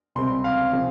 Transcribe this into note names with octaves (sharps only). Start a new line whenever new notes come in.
C#2 C3 G3 C4 C6
F5
C#3 F3 C4